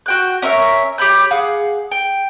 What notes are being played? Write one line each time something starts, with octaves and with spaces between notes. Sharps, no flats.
F#4 G5 F#6
C#4 A#4 C#5 E5
G4 C#5 B5 G6
G#4 F5 F#5
G5